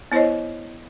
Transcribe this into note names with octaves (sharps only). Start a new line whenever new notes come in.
B3 E4 C5 C#5 D#5